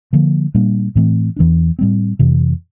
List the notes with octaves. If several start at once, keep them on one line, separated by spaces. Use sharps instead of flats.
D3 F3 A#3
A#2 G3 A#3 D4
A2 E3 A3 C4
E2 E3 A#3 D4
A2 G3 C4
F2 C3 E3